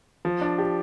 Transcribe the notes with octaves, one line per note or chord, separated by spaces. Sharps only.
F3
D4
G4